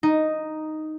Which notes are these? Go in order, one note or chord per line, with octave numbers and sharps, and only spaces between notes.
D#4